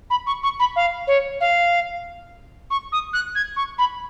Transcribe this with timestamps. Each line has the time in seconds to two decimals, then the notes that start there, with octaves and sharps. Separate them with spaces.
0.10 B5
0.27 C#6
0.43 C#6
0.60 B5
0.76 F5
1.07 C#5
1.41 F5
2.70 C#6
2.92 D#6
3.13 F#6
3.35 G#6
3.56 C#6
3.78 B5